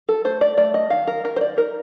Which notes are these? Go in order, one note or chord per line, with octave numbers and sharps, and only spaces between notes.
A4
A3 C5
D5
A3 D5
D#5
D#3 F5
A#4
D#3 A#4
C5
D5
D#4 A#4